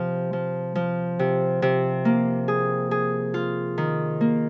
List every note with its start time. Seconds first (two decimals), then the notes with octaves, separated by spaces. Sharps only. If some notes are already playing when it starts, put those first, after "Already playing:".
Already playing: C3 F3
0.33 F3
0.75 F3
1.19 C3
1.62 C3
2.05 A#3
2.48 G#4
2.91 G#4
3.34 F4
3.78 D#3
4.21 A#3